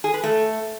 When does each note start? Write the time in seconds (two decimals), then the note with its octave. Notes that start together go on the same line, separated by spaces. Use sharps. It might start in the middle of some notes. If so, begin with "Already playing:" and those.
0.04 G#4
0.14 B4
0.24 A3